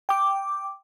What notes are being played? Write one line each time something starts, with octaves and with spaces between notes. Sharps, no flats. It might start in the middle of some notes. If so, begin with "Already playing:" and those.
G5 D6